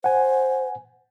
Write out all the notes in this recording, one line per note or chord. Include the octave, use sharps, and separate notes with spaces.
C5 F#5 G#5